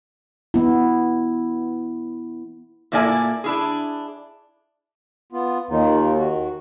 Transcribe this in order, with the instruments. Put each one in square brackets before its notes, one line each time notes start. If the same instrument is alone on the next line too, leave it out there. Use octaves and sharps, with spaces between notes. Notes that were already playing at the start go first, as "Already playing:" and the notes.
[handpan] B3 E4
[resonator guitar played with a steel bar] A#2 A3 A#3 E4 D5 G#5
D4 E4 G#4
[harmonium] B3 F4
[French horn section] D#2 [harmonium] D#3 D#4 F4
[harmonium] D#3 F#4